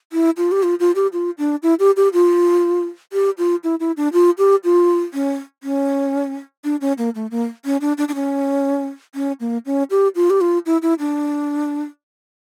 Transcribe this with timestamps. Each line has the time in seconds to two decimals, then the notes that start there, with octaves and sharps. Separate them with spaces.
0.13 E4
0.37 F4
0.52 G4
0.63 F4
0.80 F4
0.95 G4
1.13 F4
1.38 D4
1.63 E4
1.79 G4
1.96 G4
2.13 F4
3.13 G4
3.38 F4
3.64 E4
3.80 E4
3.97 D4
4.13 F4
4.38 G4
4.64 F4
5.14 C#4
5.63 C#4
6.64 D4
6.81 C#4
6.98 A#3
7.15 A3
7.31 A#3
7.65 C#4
7.81 D4
7.98 D4
8.08 D4
8.15 C#4
9.15 C#4
9.40 A#3
9.66 C#4
9.90 G4
10.15 F4
10.30 G4
10.41 F4
10.66 E4
10.82 E4
10.99 D4